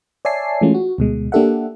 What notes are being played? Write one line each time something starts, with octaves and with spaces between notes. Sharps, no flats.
C#5 D5 E5 G#5 A5 C7
E3 G#3 A3 C#4 F4
F#4
D2 B2 G#3
A#3 D4 G4 A4 E5 F#5